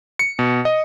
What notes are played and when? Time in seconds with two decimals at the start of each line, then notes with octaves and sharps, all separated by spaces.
0.19 C#7
0.39 B2
0.65 D#5